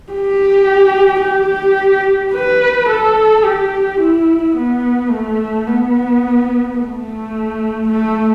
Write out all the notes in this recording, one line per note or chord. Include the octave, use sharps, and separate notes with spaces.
G4
G4
B4
A4
G4
E4
B3
A3
B3
A3
A3